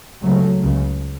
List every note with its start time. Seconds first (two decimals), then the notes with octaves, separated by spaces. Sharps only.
0.23 C#2 C#3 F#3 A3
0.62 C#2 C#3